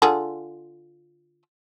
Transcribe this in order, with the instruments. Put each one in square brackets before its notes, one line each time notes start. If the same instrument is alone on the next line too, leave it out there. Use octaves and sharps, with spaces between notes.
[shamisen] D3 F4 G#4